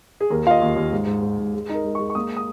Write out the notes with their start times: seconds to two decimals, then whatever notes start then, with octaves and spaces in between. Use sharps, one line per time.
0.20 G#4
0.30 D#2 A#4
0.46 F4 F5
0.51 D#5
0.62 D#2
0.76 D#2
0.92 G#2
1.07 G#2
1.22 G#2
1.38 G#2
1.54 G#3
1.69 D#4 A#4
1.84 G#3
1.95 G#3 C#6
2.10 C#6
2.15 A#3 D#6
2.37 D#6